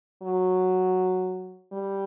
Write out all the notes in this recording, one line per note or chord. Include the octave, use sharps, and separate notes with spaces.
F#3
G3